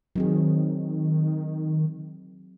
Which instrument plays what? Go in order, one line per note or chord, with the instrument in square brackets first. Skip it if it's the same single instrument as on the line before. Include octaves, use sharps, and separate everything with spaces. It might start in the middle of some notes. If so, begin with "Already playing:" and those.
[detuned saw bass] D#3 [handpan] F#3 C4 G#4